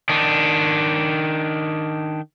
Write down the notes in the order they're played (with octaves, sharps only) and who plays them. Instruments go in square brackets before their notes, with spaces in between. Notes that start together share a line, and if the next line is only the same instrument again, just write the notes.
[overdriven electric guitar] D#3 D4